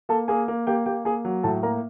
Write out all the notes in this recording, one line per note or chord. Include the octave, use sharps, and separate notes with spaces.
A#3 A4 A5
A#3 G#4 G#5
A#3
A#3 G4 G5
A#3 G4 G5
A#3 G#4 G#5
F#3
A2 A4 A5
A#3 A#4 A#5